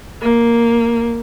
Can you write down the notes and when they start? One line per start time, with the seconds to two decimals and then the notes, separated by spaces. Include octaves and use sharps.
0.22 A#3